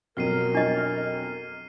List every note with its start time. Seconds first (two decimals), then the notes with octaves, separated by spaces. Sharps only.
0.17 F2 B2 F#3 A#4 F6 C7 D#7
0.55 D4 D#5